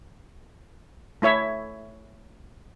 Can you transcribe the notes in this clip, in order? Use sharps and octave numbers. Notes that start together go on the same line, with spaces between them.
A3 E4 C#5 E5